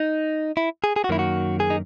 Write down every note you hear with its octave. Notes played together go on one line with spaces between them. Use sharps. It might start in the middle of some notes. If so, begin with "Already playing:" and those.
Already playing: D#4
E4
G#4
G#4
F#4
F#2 D#3 A#3 E4
F#4
G#4
D#4